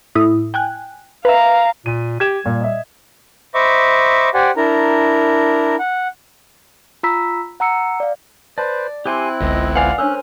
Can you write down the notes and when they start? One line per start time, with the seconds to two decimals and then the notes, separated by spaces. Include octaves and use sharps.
0.15 A2 E4 D#6
0.54 G5 G#5 F#6
1.25 B4 E5 F5 A#5
1.86 A#2 D#7
2.20 G4 G#6 E7
2.46 A#2 G3
2.61 D#5 E5
3.55 C5 D#5 E5 B5 C#6 D6
4.34 G4 C5 D5 F#5 G#5
4.57 D4 E4 A#4 A#5
5.79 F#5
7.03 F4 A#5 B5 E6 B6
7.60 F#5 A#5 E6 C#7
8.00 D5 F5
8.58 B4 C5 D5 A5
9.06 C4 E4 G4 G#5 C6 D6 F#6
9.41 G1 C#2 D#5
9.75 B4 D5 F5 F#5 G#5 D6
9.98 C#4 D4 A#4 C5 C#5 G#5 E6 F#6